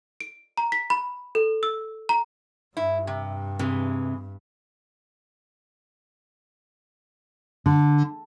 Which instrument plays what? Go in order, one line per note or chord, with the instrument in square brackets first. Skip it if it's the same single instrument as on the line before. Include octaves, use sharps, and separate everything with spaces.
[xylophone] D7
A#5
B6
B5
A4
E6
A#5
[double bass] G2 [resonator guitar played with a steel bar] E4
[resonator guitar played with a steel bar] C3
[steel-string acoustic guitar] C3 [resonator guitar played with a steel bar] E3 G#3
[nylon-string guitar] D3